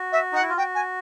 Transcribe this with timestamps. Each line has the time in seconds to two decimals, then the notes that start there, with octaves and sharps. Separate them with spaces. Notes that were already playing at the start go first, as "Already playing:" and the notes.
Already playing: F#4
0.12 E5
0.32 D#4 F#5
0.42 E4
0.49 F4
0.57 F#4 G5
0.75 G#5